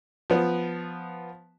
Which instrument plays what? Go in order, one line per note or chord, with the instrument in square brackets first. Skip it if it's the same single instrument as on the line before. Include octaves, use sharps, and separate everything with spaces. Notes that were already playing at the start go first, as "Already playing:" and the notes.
[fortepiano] F3 B3